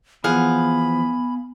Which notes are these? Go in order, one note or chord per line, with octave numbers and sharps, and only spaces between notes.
E3 F3 B3 G#4 F5 F#5 B5